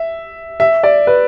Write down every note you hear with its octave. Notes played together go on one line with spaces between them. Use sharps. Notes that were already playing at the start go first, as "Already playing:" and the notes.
Already playing: E5
E5
D5
B4